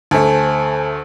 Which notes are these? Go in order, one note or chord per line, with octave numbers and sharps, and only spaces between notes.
D2 A3 C5 G#5 A5